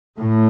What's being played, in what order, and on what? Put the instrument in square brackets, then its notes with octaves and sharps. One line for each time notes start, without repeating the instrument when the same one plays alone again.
[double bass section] A2